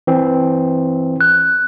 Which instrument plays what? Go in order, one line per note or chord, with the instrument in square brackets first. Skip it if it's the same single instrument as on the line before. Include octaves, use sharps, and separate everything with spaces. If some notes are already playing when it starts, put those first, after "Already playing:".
[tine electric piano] E3 C4
[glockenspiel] F#6